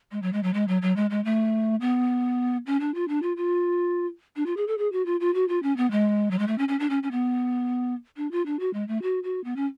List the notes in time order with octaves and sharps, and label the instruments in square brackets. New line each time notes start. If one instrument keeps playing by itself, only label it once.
[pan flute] G#3
F#3
G#3
F#3
G#3
F#3
F#3
G#3
G#3
A3
B3
C#4
D4
F4
D4
F4
F4
D4
F4
G#4
A4
G#4
F#4
F4
F4
F#4
F4
C#4
B3
G#3
F#3
G#3
A3
C#4
C#4
D4
C#4
C#4
B3
D4
F4
D4
F#4
G#3
A3
F#4
F#4
B3
C#4